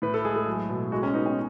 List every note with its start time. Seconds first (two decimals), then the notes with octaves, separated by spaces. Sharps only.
0.02 A2 B4
0.14 A4
0.25 G#3 G#4
0.36 A4
0.47 F#3
0.69 B2
0.92 G#3 F#4
1.03 C#4
1.14 B3 D#4
1.26 C#4